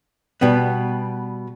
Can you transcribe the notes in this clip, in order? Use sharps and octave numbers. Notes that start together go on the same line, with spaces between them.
B2 G3 B3